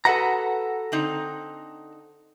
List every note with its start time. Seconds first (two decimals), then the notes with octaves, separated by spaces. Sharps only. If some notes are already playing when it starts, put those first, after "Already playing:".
0.05 F#4 A4 B4 D#5 F#5 A#5
0.92 D3 C4 D#4